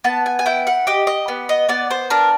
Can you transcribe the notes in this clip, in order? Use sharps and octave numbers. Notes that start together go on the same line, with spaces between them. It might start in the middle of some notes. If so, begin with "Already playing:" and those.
B3 A5
G#5
G#5
E4 G5
F#5
G4 D#5
D#5
B3
D#5
B3 D5
C5
D4 A#4